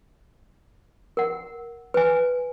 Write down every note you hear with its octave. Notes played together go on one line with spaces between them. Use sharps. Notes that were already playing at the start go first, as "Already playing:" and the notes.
A#4 F#5
B4 G#5